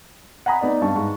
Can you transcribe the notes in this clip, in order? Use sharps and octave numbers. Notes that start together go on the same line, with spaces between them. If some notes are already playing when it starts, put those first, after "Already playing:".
F#5 G#5 A#5 B5 D#6
B3 D#4 D5
G2 A5 C#6
G#2 C#6